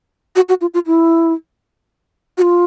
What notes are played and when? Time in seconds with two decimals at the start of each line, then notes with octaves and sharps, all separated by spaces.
0.36 F#4
0.49 F#4
0.61 F4
0.74 F4
0.86 E4
2.38 F#4
2.42 F4